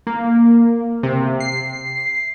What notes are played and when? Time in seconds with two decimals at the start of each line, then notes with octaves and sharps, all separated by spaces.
0.07 A#3
1.03 C3
1.40 C7